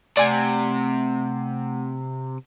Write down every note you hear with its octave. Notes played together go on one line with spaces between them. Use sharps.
C3 A3 D5 F#5 G#5 G#6